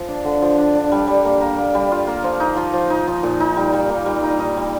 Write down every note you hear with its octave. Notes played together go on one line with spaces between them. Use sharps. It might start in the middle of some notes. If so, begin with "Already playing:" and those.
Already playing: F3
D4
D3
F3
D4
D4
G3
G3
A#3
A#3
A#3
G3
F4
A#3
F3
D#4
F3
F3
D#4
F3
A#2
D#4
G3
G3
A#3
G3
D#4
D#4
G3